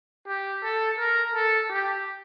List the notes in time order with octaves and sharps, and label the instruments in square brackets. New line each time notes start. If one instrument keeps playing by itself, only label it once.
[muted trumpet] G4
A4
A#4
A4
G4